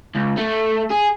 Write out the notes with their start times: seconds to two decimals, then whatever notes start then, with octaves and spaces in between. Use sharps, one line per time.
0.15 C#2
0.37 A3
0.90 G#4